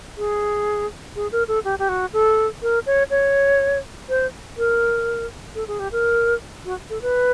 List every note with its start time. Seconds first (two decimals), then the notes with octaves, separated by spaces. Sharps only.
0.18 G#4
1.16 G#4
1.32 A#4
1.48 A4
1.64 G4
1.79 G4
1.89 F#4
2.13 A4
2.62 A#4
2.86 C#5
3.10 C#5
4.09 C5
4.58 A#4
5.55 A4
5.68 G#4
5.79 G4
5.92 A#4
6.65 F#4
6.90 A4
7.02 B4